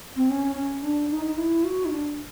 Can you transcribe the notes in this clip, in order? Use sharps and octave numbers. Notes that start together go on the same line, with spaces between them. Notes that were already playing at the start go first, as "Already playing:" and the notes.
C4
C#4
C#4
D4
D#4
D#4
E4
F#4
D#4
D4